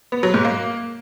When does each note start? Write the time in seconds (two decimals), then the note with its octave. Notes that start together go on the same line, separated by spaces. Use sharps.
0.12 B3
0.23 F#3
0.34 G#2
0.45 A#3